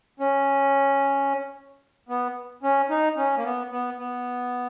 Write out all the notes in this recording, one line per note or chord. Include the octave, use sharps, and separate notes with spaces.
C#4
B3
C#4
D#4
C#4
A#3
B3
B3
B3